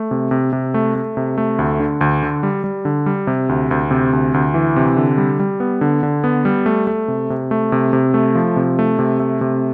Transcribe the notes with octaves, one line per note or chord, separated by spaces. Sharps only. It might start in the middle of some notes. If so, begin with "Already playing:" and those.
Already playing: A3
C3
C3
C3
A3
A3
C3
A3
D2
D3
D2
D3
G3
G3
D3
G3
C3
D2
D2
C3
D2
D2
E3
C3
D3
G3
G3
B3
D3
D3
B3
G3
A3
A3
C3
C3
A3
C3
C3
A3
F3
C3
A3
C3
A3
C3